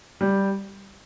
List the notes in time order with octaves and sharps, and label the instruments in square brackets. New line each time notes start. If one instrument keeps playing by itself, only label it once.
[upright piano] G3